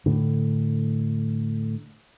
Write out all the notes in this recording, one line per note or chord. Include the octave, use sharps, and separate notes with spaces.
A2 D3